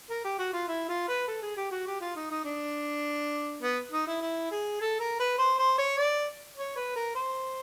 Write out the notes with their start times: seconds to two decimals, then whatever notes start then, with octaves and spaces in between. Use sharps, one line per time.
0.10 A#4
0.24 G4
0.39 F#4
0.53 F4
0.68 E4
0.89 F4
1.08 B4
1.28 A4
1.42 G#4
1.56 G4
1.71 F#4
1.86 G4
2.01 F4
2.16 D#4
2.31 D#4
2.45 D4
3.62 B3
3.92 D#4
4.07 E4
4.21 E4
4.51 G#4
4.81 A4
4.99 A#4
5.20 B4
5.38 C5
5.58 C5
5.78 C#5
5.98 D5
6.56 C#5
6.76 B4
6.96 A#4
7.15 C5